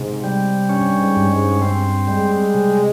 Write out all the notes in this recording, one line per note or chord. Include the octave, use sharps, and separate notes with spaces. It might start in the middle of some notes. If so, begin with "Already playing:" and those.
Already playing: G#2 C3
G3
G2 C#4
G#2
G2
G#2
C4
G3 G#3
C3